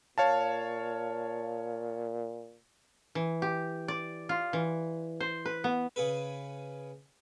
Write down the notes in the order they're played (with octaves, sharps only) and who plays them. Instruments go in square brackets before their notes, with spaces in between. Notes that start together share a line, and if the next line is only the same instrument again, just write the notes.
[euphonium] A#2 [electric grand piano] C#5 F5 A5
[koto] E3
G4
D5
F4
E3
C5
B4
B3
[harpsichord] C#3 G#4 B4